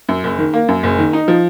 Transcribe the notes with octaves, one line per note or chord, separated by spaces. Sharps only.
F#2
F#1
D#3
A#3
F#2
F#1
D#3
D#4
F3